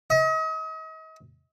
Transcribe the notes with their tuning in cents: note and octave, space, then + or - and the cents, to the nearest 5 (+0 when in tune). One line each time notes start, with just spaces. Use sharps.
D#5 +40